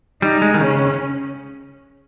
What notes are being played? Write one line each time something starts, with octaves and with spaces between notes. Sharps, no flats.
G3 D#4
G#3
D#3
C#3 C#4